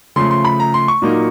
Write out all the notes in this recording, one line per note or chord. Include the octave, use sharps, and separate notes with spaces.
C#3 F3 A3 C6
C6
B5
A#5
C6
C#6
A#2 F#3 A#3 D#4